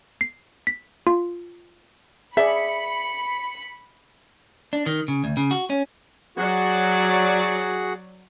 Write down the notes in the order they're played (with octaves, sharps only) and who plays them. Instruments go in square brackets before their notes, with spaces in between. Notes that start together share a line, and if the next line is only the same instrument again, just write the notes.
[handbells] C7
B6
F4
[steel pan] G#4 D5 [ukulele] E5 [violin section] B5 C#7
[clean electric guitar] D4
D#3
C#3
D2
C#3
F#4
C#4
[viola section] F#3 D5 [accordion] F#4 G#4 F#5